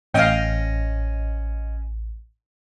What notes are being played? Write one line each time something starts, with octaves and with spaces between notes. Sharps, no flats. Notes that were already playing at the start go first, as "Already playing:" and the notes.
A1 C#4 D#5 F5 G5